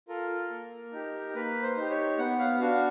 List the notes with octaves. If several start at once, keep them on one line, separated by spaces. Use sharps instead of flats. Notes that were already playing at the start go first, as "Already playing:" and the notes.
F4 A4 A#4
A#3
D#4 G4
A#3 B4
C5
D#4 G4
C#5
B3 F#5
F5
D4 F#4 F5